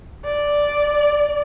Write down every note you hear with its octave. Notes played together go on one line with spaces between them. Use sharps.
D5